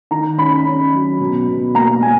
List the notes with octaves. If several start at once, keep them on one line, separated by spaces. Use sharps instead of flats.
D#3 A#5
C#4 B5
C#4
F#3
B2
B2
A#3 A#5
A#3 G#5